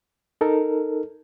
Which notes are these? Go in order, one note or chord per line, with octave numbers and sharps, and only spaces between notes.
D#4 A4 A#4